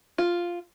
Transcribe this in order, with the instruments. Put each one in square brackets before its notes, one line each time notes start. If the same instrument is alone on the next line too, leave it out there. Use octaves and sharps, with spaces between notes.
[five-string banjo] F4